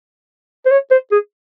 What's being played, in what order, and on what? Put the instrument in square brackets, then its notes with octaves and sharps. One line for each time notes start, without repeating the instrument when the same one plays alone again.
[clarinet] C5
C#5
C5
G#4